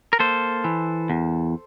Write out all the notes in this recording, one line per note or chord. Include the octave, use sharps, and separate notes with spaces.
A#4
A#3 A4 C5
E3
E2